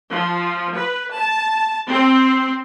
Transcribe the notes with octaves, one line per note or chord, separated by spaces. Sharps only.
F3
B4
A5
C4